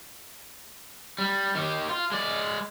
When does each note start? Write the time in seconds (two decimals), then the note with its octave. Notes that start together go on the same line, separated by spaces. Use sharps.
1.18 G3
1.55 D#3 G4
1.90 F4
2.12 G#3 D5